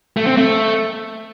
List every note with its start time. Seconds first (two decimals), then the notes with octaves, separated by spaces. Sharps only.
0.17 A3
0.27 C4
0.37 A3